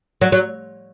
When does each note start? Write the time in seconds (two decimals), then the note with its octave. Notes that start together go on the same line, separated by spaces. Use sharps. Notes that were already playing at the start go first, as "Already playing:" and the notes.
0.21 F#3
0.32 F#3